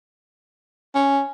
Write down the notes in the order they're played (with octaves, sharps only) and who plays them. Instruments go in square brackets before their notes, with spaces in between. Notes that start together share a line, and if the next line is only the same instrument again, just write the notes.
[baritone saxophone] C#4